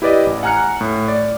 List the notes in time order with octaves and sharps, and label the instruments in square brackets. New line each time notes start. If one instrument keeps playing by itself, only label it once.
[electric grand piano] E4 G4 B4 D5 D#5
A1
F#5 G#5 A#5 F6 F#6 C#7
A2
D5